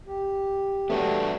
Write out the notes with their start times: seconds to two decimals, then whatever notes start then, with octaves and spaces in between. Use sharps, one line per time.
0.07 G4
0.90 A3 B3 D4 F#4